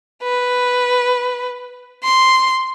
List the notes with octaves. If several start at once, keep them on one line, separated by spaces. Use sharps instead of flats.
B4
C6